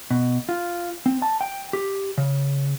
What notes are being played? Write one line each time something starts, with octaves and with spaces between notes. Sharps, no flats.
B2
F4
C4
A5
G5
G4
C#3